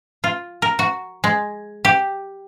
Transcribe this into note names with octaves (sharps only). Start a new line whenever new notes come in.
F4
A#4
F#4
G#3
G4